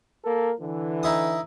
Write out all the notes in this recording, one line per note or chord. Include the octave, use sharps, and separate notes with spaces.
A#3 A4 A#4
D3 E3
D#4 E4 D#6